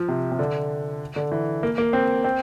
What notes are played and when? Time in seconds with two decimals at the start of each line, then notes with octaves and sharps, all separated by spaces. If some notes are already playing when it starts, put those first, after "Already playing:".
Already playing: F3
0.08 C3
0.32 C3
0.39 D3
1.16 D3
1.32 E3
1.63 A#3
1.78 A#3
1.93 C4
2.24 C4